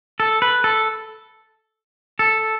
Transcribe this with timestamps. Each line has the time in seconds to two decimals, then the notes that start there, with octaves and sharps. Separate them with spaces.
0.20 A4
0.42 B4
0.64 A4
2.19 A4